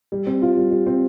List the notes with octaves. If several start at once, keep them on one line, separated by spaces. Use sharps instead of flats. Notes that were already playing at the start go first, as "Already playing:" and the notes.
G3
C4
F4
G3
G3
C4